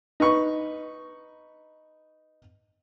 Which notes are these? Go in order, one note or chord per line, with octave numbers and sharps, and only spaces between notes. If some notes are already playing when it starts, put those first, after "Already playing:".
D#4 B4 C#6